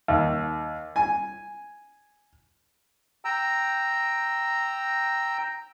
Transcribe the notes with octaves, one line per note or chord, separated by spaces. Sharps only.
D#2
G#5
G5 A#5 E6